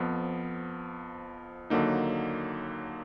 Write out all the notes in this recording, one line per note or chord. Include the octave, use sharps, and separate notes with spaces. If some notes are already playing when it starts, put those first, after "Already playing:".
Already playing: F2 F3 B3
D#2 D3 F#3 A#3 D#4